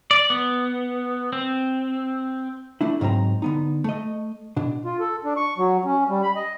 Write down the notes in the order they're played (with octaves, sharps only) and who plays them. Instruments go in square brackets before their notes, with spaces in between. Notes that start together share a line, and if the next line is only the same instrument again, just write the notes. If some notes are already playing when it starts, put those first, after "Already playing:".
[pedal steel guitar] D5
B3
C4
[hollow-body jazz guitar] A3 D4 E4
C#2 G#2 F#3 C4 A#5
D3 B3 D#4
A3 D#5
B2 D4
[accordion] F4
A4
D4
C#6
F#3
C#4
G3
B5
D#5